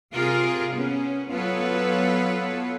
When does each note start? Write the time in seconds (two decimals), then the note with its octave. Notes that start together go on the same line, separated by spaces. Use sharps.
0.13 C3 F4 G#4 A#4
0.73 B3 C#4
1.30 F#3 B3 F4 A4 B4 C#5